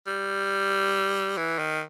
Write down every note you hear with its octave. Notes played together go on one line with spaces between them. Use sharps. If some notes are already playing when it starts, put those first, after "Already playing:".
G3
E3
D#3